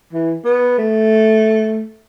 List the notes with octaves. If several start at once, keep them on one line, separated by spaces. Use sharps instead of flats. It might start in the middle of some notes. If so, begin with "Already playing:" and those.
E3
B3
A3